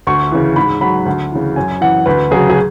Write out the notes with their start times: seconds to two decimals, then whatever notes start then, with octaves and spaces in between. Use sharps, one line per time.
0.07 D2 C#6
0.31 C#3 E3
0.56 G#2 B5
0.81 F#3 B5
1.06 D2
1.32 C#3 E3
1.56 F#2 G#5
1.81 E3 F#5
2.06 D2 B4
2.31 C#3 F#3 G#4
2.50 G#4